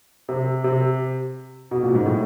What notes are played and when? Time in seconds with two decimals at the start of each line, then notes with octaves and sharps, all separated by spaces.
0.29 C3
0.64 C3
1.71 B2
1.83 A#2
1.95 G#2
2.06 A2